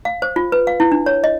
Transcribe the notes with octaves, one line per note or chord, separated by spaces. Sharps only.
F5
C5
F4
B4
F5
E4
D4
C#5
D#5